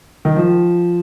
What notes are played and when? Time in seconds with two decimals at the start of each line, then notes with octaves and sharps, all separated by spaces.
0.25 D#3
0.36 F3